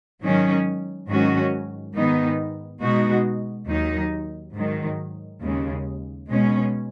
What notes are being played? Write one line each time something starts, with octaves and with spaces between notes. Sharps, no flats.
G#2 D#3 F#3 C#4
G#2 D#3 F#3 C#4 F#4
G#2 D#3 B3 D#4
B2 G#3 D#4 F#4
D#2 D#3 F#3 D#4
G#2 D#3 F#3
D#2 C#3 G#3
B2 G#3 C#4